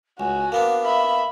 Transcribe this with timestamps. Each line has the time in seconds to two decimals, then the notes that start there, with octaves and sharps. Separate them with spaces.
0.20 C#2 F#4 G#5
0.52 A#3 B3 D4 F5
0.84 E5 B5